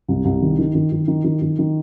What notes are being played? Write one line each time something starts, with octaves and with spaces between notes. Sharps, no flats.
C2
C2
D#3
D#3
D#3
D#3
D#3
D#3
D#3
D#3